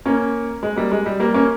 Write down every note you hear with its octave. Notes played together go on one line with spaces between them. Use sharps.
A#3 C#4
G#3
G3 A#3
G#3
G3
G3 A#3
A#3 C#4